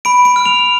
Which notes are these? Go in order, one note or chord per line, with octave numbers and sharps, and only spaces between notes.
B5 D7
D7
F6
F7